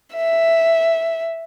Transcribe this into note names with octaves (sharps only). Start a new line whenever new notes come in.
E5